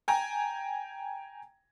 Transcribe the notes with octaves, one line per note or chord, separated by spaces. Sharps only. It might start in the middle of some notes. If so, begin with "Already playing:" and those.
G5 G#5 A#5